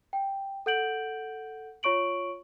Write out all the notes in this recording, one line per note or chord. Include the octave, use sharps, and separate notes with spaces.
G5
A4 F#5 G6 D7 F#7
F4 C#5 C#6 D7 F#7